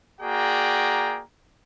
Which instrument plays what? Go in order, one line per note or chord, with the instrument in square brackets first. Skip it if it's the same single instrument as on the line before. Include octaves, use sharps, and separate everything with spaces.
[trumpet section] A#3 F#4 G#4 D5 G5 A#5